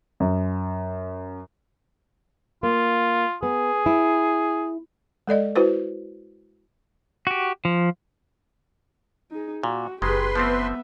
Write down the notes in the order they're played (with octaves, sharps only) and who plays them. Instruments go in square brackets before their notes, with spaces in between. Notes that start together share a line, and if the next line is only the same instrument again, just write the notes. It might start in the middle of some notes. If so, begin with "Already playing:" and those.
[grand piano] F#2
[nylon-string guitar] A#3 [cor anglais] F4
[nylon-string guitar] B3 [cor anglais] G#4
[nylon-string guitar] E4
[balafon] G#3 A4 D5 D#5
E4 F#4 B4 C5
[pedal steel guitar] F#4 G4
F3
[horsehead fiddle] D#4 G#4
[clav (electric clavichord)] A#2 [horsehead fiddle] F#4
[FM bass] F#1 [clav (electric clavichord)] D#3 G#3 [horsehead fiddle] G4 G#4 [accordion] B4 C6
[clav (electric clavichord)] F3 A3 C4 [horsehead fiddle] B3 E5